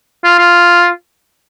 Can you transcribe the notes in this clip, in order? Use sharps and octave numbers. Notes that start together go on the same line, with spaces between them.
F4
F4